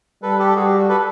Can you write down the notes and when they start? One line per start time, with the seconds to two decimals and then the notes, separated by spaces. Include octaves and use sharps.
0.22 G3 A4 B4
0.39 G4 A4
0.56 G3 F#4 G#4
0.67 G4
0.78 F#4
0.89 A4 B4